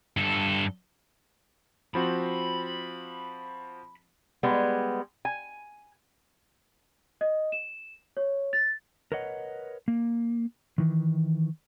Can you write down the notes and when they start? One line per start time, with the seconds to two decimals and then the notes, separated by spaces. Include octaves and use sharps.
0.17 G2 A4
1.95 F3 C4 F#4 B5
4.43 G3 G#3 B3
5.25 G#5
7.21 D#5
7.52 E7
8.17 C#5
8.53 A6
9.12 A#4 B4 C#5 D#5 F#5
9.88 A#3
10.78 D#3 E3